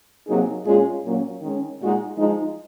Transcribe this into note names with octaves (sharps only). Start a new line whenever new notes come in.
C3 F#3 A#3 D#4 G#4
A#2 G#3 C#4 F4 G#4
A#2 F#3 A#3 C#4
D#3 G#3 C#4
A#2 G#3 D#4 F#4
F3 G#3 D#4